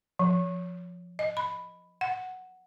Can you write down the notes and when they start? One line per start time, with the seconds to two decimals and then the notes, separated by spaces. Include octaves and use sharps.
0.19 F3
1.19 D#5
1.37 B5
2.01 F#5